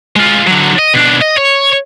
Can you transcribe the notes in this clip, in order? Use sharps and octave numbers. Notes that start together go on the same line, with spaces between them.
G#3 F4
D3 F#3
D#5
B2 D4
D#5
C#5